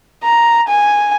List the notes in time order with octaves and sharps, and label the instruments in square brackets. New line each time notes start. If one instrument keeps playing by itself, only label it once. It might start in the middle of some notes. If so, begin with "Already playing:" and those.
[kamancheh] A#5
G#5